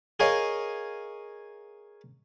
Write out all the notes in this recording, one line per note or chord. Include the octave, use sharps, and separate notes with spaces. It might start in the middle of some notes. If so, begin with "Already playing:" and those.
G#4 A#4 C#5 D#5 F5